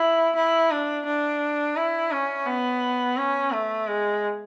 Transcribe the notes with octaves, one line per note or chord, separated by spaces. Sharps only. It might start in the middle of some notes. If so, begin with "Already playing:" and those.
Already playing: E4
E4
D4
D4
E4
C#4
B3
C#4
A3
G#3